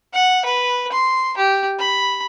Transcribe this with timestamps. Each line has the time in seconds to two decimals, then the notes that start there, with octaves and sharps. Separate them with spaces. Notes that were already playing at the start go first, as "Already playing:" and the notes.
0.13 F#5
0.45 B4
0.92 C6
1.37 G4
1.79 B5